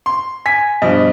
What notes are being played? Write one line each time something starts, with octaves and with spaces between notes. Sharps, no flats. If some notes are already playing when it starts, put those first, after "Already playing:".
C6
G#5 B6
G2 B2 F3 D#5